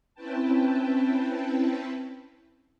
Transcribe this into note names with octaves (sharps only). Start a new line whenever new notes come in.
C4 C#4 E4 B4 G5 A5